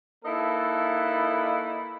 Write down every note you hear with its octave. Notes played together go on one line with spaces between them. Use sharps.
A#3 D#4 E4 A4 B4